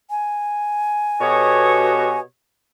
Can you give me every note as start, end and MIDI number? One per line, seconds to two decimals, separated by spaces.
0.10 2.20 80
1.21 2.21 47
1.21 2.21 66
1.21 2.21 67
1.21 2.21 69
1.21 2.21 73
1.21 2.21 87